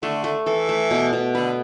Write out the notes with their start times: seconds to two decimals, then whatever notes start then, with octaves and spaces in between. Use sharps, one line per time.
0.02 D3 A3
0.24 A3
0.46 E3 A4
0.69 A3
0.91 B2
1.13 B2
1.35 D3 B4